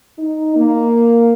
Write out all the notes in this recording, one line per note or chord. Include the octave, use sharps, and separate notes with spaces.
D#4
A#3